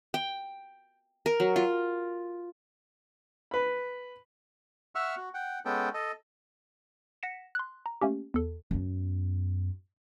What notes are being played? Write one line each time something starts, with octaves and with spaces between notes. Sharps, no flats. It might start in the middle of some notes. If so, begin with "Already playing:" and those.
G5
A#4
F#3
F4
B4 B5
E5 F#5 C#6 E6 F6
F#4
F#5 G5
G#3 B3 C#4 A4 G5
A4 D#5
F#5 A#6 B6 C#7 E7
C6 F#6
A#5
A3 A#3 C#4 G4
E2 A4
F#2 B3